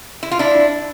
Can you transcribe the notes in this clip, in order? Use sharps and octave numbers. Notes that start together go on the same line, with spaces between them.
E4
F4
D4 E4